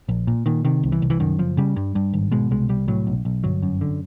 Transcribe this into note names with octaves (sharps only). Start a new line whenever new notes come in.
A#1
A#2
A#2 D#3
C3 D#3
C2
E3
C2
E3
F#2 D#3
F#1 F3
C#3 G3
G2
G2
G#1
B2 G#3
C2 G#3
C2 G3
A2 F#3
B1
B1
G1 F#3
F#2
D3